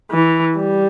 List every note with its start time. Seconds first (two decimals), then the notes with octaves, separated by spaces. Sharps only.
0.12 E3
0.57 G3